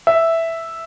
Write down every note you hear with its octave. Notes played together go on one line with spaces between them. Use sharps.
E5